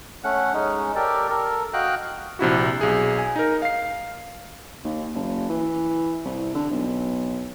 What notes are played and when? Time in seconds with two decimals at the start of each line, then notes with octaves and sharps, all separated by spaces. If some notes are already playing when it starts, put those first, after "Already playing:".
0.24 A3 C#4 F#5
0.54 G#3 C#4 D#4
0.95 G4 A4 A#4 D5
1.29 A4 A#4
1.73 F#4 D#5 F5 G5 F#6
2.39 A#1 C3 E4 F#4
2.81 B1 G#4
3.19 G#5
3.36 D#4 A#4
3.62 F5 C7
4.84 D#2
5.15 F#1
5.49 E3
6.25 C2
6.55 D3
6.71 B1